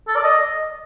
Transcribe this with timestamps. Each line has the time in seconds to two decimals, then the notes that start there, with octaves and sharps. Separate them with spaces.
0.08 A4
0.16 D5
0.24 D#5